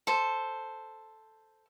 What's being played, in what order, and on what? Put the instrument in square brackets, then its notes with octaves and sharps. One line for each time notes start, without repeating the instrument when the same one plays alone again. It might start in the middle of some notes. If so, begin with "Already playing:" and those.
[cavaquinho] A4 C5